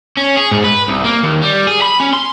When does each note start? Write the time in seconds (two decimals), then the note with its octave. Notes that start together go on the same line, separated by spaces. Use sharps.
0.17 C#4
0.37 G#4
0.51 G#2
0.64 B4
0.88 C2
1.04 A#3
1.23 D#2
1.42 G3
1.67 G#4
1.82 B5
2.00 C#4
2.14 C6